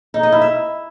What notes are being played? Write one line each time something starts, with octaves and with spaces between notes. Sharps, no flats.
D#4
D#5
E4
E5